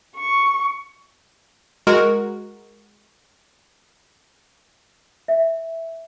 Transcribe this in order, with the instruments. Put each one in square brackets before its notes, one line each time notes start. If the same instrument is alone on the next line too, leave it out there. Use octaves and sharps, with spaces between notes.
[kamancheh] C#6
[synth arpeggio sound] G#3 F#4 A#4
[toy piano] E5